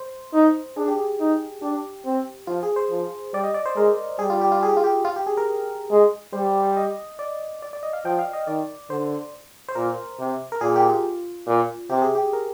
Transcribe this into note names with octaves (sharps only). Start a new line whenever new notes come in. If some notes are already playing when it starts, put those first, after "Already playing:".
Already playing: C5
D#4
D4 G#4
G4
G#4
D#4
D4 G4
C4
F3 F4
G#4
C5
F3
G3 D5
D#5
D5
C5
G#3 A#4
G3 G#4
F4
G4
F4
G#4
G4
F4
G4
F4
G4
G#4
A#4
G#3
G3 C5
D#5
D5
D5
D5
D#5
F5
F3 G5
F5
D#5
D#3 D5
D3 C5
C5
A#2 A#4
C3
A#4
A#2 G#4
G4
F4
A#2
C3 G4
G#4
G4
A#4